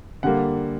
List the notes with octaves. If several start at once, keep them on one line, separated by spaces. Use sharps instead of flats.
D3 G3 A#3 F#5